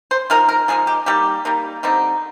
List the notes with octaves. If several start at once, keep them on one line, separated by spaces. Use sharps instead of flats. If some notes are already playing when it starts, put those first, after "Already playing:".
C5
F3 G#3 D#4 A#4
A#4
F3 G#3 D#4 G#4
G4
G3 A#3 D#4 G4
G3 A#3 D#4
D3 G3 C4 D#4